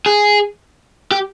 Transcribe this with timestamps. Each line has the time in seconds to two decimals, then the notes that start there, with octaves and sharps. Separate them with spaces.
0.06 G#4
1.11 G4